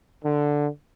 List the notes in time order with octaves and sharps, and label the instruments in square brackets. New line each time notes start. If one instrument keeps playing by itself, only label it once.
[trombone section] D3